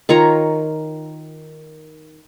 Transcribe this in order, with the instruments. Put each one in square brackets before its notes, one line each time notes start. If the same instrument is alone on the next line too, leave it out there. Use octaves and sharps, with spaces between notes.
[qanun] D#3 F4 C#5 A#5